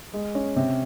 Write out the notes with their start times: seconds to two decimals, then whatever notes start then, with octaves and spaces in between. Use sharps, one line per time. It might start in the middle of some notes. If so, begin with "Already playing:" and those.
0.14 G#3
0.35 C#4
0.56 C3